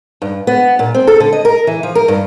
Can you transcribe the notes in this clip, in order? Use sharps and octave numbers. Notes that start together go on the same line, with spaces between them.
G2
B3
A#2
C4
A4
D3
D#5
A#4
E3
F3
A#4
G2